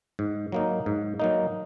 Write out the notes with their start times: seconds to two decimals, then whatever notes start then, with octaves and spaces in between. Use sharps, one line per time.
0.19 G#2
0.52 F#3 A#3 D#4
0.86 G#2
1.20 F#3 A#3 D#4